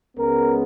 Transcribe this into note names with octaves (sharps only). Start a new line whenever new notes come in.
C#2 C#3 G#3 B3 A#4